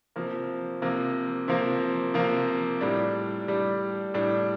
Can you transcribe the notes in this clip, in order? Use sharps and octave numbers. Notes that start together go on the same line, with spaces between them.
C3 F3 A#3
C3 F3 A#3
C3 F3 A#3
C3 F3 A#3
A2 G3 D4
A2 G3 D4
A2 G3 D4